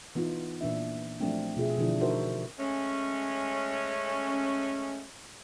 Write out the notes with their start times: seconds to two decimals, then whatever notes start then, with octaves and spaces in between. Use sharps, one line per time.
0.15 E3 B3 D#4 F4
0.61 A#2 E3 D4 E5
1.20 F3 F#3 A3 C4 D4
1.57 B2 F4 G#4 E5
1.78 B2 D3 E3 F3 D4 E4
2.01 D#4 F#4 A4 A#4 C5 E5
2.58 G#3 A3 C#4